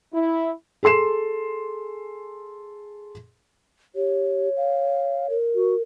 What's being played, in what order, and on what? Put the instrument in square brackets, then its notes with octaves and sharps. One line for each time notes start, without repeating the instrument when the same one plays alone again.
[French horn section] E4
[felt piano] G#4 A4 C6 C7 E7
[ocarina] G4 [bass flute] C#5
[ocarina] F5
A#4
[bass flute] F#4